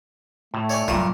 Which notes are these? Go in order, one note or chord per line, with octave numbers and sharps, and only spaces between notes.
A2 A3
C#5 D5 G#5
G2 A#2 F#3 G3 F4 A#4